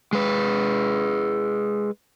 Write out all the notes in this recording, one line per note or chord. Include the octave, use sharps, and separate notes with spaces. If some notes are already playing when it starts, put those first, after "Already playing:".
G#3 B4